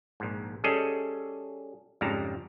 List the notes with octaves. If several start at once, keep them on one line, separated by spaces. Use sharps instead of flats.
A#1 G#2
G3 C#4 G#4 A4 D#5
F2 G#2 C#3 G3 A5 A#5